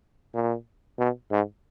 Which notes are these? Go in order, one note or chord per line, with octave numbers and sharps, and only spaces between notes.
A#2
B2
G#2